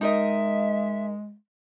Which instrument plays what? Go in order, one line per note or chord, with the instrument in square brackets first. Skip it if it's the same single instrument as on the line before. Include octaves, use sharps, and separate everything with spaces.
[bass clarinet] G#3 [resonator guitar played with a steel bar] D#4 A#4 D#5 [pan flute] E5